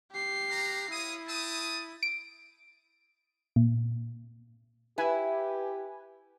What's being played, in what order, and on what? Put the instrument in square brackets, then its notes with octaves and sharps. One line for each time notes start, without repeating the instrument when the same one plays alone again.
[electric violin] G4 C7
[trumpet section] B4 F5 A#5
[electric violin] E4 [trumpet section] C#5 F5 D#6
[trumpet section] G5 A5 D#6
[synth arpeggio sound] D7
A#2
[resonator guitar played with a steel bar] E4 [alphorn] G4 [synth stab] B4 G#5